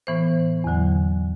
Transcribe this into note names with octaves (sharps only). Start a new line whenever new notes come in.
A2 E3 B3 C5
E2 D3 F#3